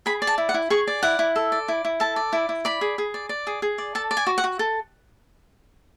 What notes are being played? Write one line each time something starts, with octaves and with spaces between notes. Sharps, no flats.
G#4 B5
D5
A5
E4
F#5
E4
G#4 C#6
D5
E4 F#5
E4
A4
D5
E4
E4
A4 A5
D5
E4
E4
D5 B5
G#4
G#4
D5
D5
G#4
G#4
D5
A4 A5
D5
G#5
F#4
F#5
F#4
A4